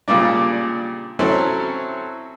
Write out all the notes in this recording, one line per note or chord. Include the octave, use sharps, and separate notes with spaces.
A#2 C#3 G3 D4
F#3 C4 C#4 E4 A4